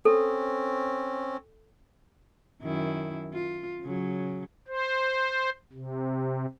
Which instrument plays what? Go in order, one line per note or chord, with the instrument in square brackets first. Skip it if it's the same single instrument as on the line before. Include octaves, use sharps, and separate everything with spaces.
[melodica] C4 C#4 [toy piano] A4
[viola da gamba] F#2 D#3 E4
F4
C#3 F#3
[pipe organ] C5
C3